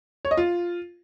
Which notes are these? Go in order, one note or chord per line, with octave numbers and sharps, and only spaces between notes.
C#5
D#5
F4